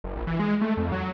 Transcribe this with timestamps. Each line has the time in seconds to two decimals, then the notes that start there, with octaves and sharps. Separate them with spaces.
0.04 F#1
0.16 A#1
0.27 E3
0.39 G#3
0.61 A3
0.77 F2
0.92 F#3